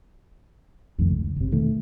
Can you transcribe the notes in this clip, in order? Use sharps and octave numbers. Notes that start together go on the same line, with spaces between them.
C2 F2 D#3 A3
C#2
G1 C3
E1 D#3 A3